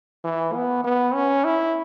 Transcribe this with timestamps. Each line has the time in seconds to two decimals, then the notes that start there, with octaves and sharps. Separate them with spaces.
0.24 E3
0.54 B3
0.84 B3
1.14 C#4
1.45 E4